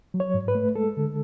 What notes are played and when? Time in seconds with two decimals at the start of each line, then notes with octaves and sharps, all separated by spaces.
0.14 F#3
0.20 C#5
0.34 G#2
0.48 B4
0.55 A3
0.75 G#3 A4
0.97 D3